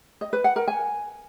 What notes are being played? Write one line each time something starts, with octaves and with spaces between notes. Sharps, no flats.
D#5
B4
F#5
A#4
G#5